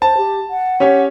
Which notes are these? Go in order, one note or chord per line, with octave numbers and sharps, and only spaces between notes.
C5 A5
G4
F#5
C#4 G4 C#5